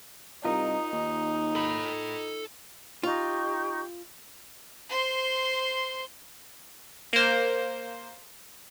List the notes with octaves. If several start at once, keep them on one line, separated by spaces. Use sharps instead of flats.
C2 D#4 F4 A#4 D#5
D#2
A4 B5
D#4 F4 G4 C#6
C5 C6
A#3 C5